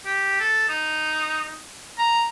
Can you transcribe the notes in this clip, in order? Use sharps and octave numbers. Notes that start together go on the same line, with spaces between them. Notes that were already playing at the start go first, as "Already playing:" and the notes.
G4
A4
D#4
A#5